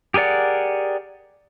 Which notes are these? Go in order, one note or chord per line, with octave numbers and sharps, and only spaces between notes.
G4 G#4 A#4 D5 F#5